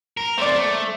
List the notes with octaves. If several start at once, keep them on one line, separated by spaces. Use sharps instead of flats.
A#4
A3 C4 C5 D5
A3